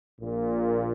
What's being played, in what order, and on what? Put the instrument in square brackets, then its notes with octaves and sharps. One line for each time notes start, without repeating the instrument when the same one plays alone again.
[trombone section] A#1 A#2